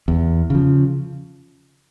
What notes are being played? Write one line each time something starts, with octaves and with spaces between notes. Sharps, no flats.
E2
C#3 F3